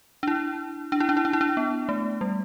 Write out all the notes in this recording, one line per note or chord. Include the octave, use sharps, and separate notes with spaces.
D4
E4
D4
E4
D4
E4
D4
E4
D4
B3
A3
G3